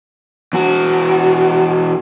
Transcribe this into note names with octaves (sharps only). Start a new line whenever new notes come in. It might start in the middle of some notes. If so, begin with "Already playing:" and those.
E2 F#4